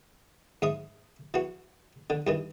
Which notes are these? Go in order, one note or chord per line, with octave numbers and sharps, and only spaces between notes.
G#2 E5 D#6
E3 F#4
D3
G2 D#3 E3